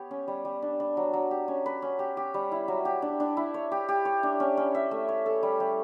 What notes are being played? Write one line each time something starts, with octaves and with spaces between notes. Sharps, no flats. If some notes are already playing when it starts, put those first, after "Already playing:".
Already playing: B3 G4 C#5
C#4
G3
G3
D4
D4
F#3
F#3
G4
C#4
B4
C#4
G4
G4
G3
E4
F#3
G4
D4
D4
E4
C#5
G4
G4
C#5
D4
C#4
C#4
E5
A3
C#5
A4
G3
G3